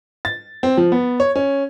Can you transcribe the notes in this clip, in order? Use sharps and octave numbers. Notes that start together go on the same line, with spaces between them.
A6
C4
F3
B3
C#5
C#4